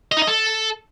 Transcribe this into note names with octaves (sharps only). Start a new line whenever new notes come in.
D#5
D#4
D#5
A4